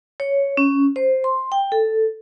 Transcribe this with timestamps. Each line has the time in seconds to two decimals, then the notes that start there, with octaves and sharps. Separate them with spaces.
0.20 C#5
0.57 C#4
0.96 C5
1.24 C6
1.52 G5
1.72 A4